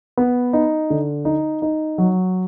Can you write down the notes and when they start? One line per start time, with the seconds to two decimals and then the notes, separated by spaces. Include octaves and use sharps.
0.17 B3
0.53 D#4
0.90 D3
1.25 D#4
1.62 D#4
1.98 F#3